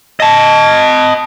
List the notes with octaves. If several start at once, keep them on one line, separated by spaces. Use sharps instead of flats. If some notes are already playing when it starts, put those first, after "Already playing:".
D#5 A5